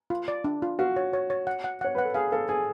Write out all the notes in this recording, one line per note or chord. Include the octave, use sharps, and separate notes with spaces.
F4
D5
D4
F4
F#4 F5
C#5
C#5
C#5
F#5
F#5
C#5 F#5
B4 F#5
A4
G#4 F5
A4 F5
G#4 G#5